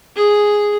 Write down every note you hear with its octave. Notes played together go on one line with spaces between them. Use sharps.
G#4